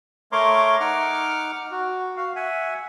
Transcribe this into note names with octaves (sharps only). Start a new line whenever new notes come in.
A3 A#4 C#5 A#5 C6 D6
D#4 F#5 D6 F6
F#4
F#4 F5
E5 F#5 G#5